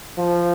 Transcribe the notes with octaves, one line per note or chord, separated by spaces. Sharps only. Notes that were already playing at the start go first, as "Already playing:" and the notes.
F3